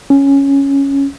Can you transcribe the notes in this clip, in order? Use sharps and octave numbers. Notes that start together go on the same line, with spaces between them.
C#4